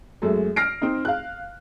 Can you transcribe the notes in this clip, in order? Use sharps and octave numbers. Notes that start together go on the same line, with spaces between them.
F#2 G#3 A3
F6 A#6 C7 D7
C4 D#4
F5 F#6